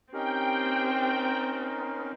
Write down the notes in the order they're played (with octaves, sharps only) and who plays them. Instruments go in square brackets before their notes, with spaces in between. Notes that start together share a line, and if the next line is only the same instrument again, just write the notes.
[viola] C4 [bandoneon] C#4 D#4 A#4 [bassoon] G4 [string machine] G5